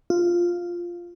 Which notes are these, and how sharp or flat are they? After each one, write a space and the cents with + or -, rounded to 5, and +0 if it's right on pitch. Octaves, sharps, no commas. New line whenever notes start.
F4 +0